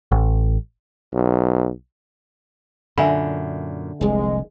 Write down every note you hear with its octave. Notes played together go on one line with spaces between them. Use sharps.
A1
B1
F#2 A#2 D3 E5 G#5 B5
F1 C2 G#3